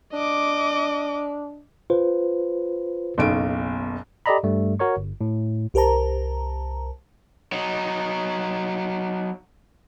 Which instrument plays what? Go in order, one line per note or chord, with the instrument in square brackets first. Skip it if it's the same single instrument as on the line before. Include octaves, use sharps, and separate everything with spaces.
[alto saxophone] D4 [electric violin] D#5 D6
[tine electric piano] F4 B4 C5
[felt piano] F#1 B1 D7 [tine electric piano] B3
[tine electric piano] G4 A4 D5 D#5 A#5 B5
G2 G3 A3
F#4 A#4 C#5 C#6
G1
A2
[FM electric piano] C2 G4 A#4 C5 A5 A#5
[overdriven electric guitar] F#3 D#4